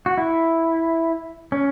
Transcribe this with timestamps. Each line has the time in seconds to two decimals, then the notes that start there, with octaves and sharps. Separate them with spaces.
0.06 F#4
0.18 E4
1.52 C#4